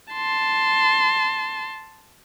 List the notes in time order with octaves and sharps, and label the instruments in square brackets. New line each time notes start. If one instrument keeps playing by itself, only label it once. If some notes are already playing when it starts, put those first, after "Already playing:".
[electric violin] A5 C6